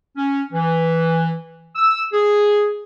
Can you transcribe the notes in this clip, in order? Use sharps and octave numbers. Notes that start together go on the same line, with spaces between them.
C#4
E3
E6
G#4